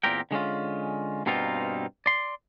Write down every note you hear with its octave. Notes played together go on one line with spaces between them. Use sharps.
E2 A#2 C4 G4 A#4 G5
D3 G#3 C#4 F4
G2 B2 A#3 C4 D#4 F4
D5 C6